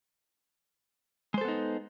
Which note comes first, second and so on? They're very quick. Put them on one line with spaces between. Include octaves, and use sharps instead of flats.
G#3 C5 A4 B3 D#4